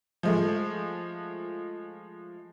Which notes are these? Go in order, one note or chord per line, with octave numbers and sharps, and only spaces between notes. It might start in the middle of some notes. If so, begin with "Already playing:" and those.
F3 G#3 A3